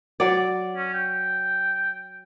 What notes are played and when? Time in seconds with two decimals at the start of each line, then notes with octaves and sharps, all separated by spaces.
0.20 F#3 D5
0.77 C#4
0.93 G5